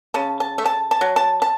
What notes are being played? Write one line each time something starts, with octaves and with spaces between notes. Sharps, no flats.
C#3 A5
A5
A3
A5
A5
F#3
A5
A5